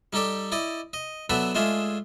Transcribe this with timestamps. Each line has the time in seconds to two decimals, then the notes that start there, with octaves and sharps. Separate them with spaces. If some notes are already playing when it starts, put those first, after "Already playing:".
0.13 G3 D#4 G4 A4 D5
0.52 E4 D5 D#5
0.93 D#5
1.30 F#3 B3 D4 A4 B4 E5
1.55 G#3 A3 D4 F4 G#4 E5